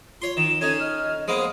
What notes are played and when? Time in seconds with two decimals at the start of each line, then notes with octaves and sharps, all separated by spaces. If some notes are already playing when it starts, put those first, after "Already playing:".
0.22 F4 C#5 C6
0.37 D#3 E7
0.61 C#4 D#4 A4 G#6
0.80 D#5 F6
1.28 G#3 A#3 B3 C5 D#6